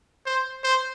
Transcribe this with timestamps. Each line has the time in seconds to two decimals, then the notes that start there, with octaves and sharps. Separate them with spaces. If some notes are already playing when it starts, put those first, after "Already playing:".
0.26 C5
0.64 C5